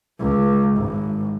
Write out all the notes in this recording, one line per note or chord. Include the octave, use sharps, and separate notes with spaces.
C#2
G#1